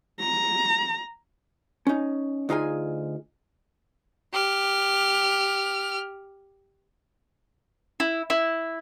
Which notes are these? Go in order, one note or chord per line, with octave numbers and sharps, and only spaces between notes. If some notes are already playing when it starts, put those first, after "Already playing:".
A#5
C#4 D#4
D2 D#4 F4 G#4 G#5
G4 F6
E4
E4